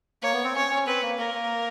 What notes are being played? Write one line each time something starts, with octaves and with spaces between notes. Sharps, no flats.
A#3 C#5
B3
C4
C#4 C#5
C#4
C4 B4
A#3
A#3 A#4
A#3